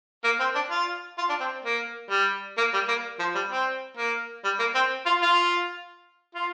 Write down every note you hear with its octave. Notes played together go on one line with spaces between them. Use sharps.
A#3
C4
D4
F4
F4
D4
C4
A#3
G3
A#3
G3
A#3
F3
G3
C4
A#3
G3
A#3
C4
F4
F4
F4